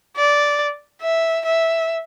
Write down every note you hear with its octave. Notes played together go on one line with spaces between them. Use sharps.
D5
E5
E5